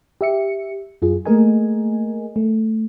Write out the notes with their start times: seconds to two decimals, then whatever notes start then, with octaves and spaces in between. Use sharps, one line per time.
0.21 G4 E5 C#7
1.02 F#2 F4 G#4
1.25 A3 A#3 G#4 A#4 D#5 G#5
2.36 A3